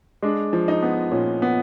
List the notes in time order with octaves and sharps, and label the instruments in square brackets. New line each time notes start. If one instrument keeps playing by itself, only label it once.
[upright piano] G#3 D4
F3
D#4
B3
A#2 C#4
B3